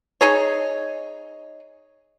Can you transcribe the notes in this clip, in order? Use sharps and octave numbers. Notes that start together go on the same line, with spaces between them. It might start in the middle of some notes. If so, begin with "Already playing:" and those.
D#4 G#4 C#5